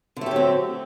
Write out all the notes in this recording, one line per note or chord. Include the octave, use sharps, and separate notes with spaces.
D3 F#3 A3 C4 G4